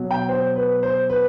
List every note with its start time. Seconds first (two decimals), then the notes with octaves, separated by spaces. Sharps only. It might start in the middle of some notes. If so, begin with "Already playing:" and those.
Already playing: B2 F#3
0.11 G5
0.29 C5
0.56 B4
0.83 C5
1.10 B4